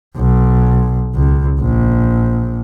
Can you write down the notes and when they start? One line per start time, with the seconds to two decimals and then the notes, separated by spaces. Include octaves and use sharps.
0.17 B1
1.15 C#2
1.60 A#1